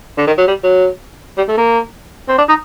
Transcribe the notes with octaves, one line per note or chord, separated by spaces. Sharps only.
D3
D#3
F#3
G3
F#3
G3
A3
A#3
C4
D4
D#4